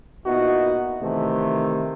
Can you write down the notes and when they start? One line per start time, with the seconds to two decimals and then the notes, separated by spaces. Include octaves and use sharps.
0.25 A#2 B3 D#4 E4 F#4
1.02 C3 D#3 E3 A3